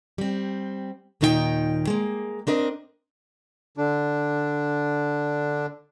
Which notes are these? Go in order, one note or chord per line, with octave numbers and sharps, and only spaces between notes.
G3 C4
D#2 A#2 D#3 D#4 G#4 G5
G#3 A#3
C4 D4 A#4 D#5
D3 D4